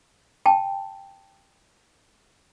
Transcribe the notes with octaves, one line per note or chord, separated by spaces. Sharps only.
G5 A5